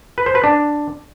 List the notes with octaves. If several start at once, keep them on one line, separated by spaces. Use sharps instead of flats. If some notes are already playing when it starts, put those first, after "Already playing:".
B4
C5
B4
D4